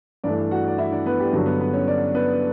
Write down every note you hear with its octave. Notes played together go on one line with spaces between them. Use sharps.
G2 E3 A3 D4 D5
F#4 F#5
D5
E4 E5
D4 D5
B3 B4
G4
G2 D3 F#3 F#4
B3 B4
B3 B4
C#4 C#5
D4 D5
B3 B4